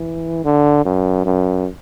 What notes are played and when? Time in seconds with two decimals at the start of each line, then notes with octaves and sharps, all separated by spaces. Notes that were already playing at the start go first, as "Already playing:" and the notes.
Already playing: E3
0.45 D3
0.85 F#2
1.25 F#2